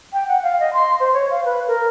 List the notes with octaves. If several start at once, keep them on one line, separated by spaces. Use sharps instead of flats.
G5
F#5
F5
D#5
C6
C5
C#5
F5
B4
A#4